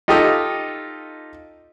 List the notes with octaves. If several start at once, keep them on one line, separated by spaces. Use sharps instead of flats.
D#4 F4 G4 A4 D#5